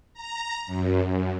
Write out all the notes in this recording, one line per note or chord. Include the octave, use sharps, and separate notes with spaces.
A#5
F#2
F#2